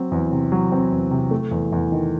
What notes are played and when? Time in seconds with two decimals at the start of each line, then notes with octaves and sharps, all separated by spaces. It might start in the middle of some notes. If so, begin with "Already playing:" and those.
Already playing: F#3 C4
0.12 E2
0.32 C3
0.52 F#3
0.72 C4
0.92 E2
1.11 C3
1.31 A3
1.51 E2
1.72 E2
1.92 D#3